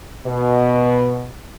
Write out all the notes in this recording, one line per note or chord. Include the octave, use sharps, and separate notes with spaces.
B2